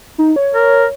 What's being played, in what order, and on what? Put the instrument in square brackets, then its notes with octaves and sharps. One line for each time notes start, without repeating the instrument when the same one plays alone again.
[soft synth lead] D#4
C#5
[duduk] A#4